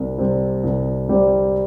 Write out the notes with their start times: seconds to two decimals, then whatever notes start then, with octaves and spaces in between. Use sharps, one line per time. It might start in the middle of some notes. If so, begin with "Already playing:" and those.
Already playing: C2 G3 C4
0.18 C3 G3 C4
0.63 C2
1.08 C3 G3 C4